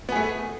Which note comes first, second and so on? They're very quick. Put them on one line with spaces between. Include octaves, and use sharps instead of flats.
B3 G#4 A3